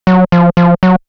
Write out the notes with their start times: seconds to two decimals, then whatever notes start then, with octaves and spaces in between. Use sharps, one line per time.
0.07 F#3
0.32 F3
0.57 F3
0.83 F#3